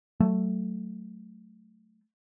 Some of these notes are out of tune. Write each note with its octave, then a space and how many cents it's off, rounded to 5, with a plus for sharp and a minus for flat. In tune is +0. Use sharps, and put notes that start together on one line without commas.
F#3 +20 A3 +0